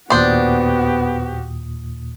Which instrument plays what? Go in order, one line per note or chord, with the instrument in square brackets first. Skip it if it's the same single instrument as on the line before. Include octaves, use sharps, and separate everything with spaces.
[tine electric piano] D#2 A#2 D#6 [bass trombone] B3 [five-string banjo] D4 C5 [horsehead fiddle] F#4 G4